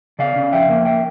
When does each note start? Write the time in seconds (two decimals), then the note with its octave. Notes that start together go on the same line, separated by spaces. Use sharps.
0.19 C#3 D5 F5
0.36 C#3
0.52 F2 E5 G5
0.69 A#3
0.85 E5 G5